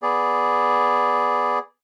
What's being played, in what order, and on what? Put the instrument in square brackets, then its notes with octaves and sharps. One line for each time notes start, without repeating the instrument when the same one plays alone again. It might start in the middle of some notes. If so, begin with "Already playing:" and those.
[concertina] B3 G#4 D5